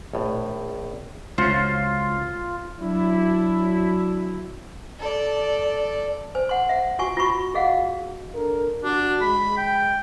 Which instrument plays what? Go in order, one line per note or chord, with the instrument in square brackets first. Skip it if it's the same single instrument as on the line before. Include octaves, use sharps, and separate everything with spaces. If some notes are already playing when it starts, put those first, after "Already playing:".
[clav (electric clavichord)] A#1 A2
[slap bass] C#2 [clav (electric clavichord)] C#4 F#4 C5 [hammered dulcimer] F4
[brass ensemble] F#3 D4 E4
[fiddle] A4 D5
[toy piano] C5 G#5
F#5 G#5 C6
E5 F#5
F4 F#4 G#5 C#6
F4 F#4 B5 C#6
F#4 G#4 D#5 F5 F#5
[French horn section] D4 A4 A#4
[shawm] D4 [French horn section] F#4
[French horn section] G#3 [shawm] B5
[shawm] G5